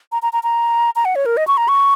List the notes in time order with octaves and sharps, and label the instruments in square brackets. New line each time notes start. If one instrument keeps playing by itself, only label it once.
[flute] A#5
A#5
A#5
A#5
A#5
F#5
C#5
A#4
D#5
C#6
A#5
C#6